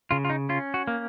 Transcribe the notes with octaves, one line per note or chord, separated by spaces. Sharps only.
C#3 F4
F4
D#4
C#4 F4
F#4
A#3